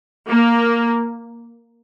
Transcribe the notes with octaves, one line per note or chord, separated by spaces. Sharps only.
A#3